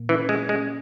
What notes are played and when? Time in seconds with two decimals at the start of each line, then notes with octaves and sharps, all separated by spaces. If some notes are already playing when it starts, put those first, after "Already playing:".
Already playing: A#2 A#3
0.09 E3 C#4
0.29 G#3
0.39 C#4
0.49 G#3